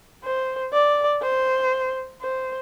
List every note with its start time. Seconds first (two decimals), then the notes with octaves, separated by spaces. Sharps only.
0.24 C5
0.73 D5
1.22 C5
2.21 C5